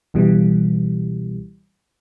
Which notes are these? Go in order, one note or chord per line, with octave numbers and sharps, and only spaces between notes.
C#2 B2 E3 G3